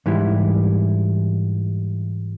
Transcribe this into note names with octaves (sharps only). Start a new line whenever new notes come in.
G#2 E3 G3 E4